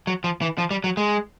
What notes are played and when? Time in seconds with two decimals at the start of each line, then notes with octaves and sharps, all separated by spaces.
0.07 F#3
0.24 F3
0.42 E3
0.58 F3
0.71 G3
0.84 F#3
0.97 G#3